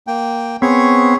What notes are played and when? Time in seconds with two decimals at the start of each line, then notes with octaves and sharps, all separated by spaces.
0.07 A#3 G5
0.62 B3 C4 G#4 C#5 C#6